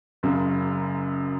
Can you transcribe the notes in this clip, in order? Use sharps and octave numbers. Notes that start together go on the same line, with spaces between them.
F#1 F#2 C#3